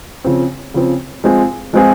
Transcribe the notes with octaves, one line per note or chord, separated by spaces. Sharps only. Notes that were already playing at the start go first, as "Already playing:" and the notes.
C#3 F3 C4
C#3 F3 C4
F3 G#3 C4 F4 G#4
F3 G#3 C4 F4 G#4